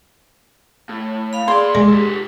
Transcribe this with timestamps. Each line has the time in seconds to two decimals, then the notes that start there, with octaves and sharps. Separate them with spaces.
0.89 A2
1.33 F5 B5
1.48 A#2 G#4 D5 C6
1.75 G#3
1.90 G4 A4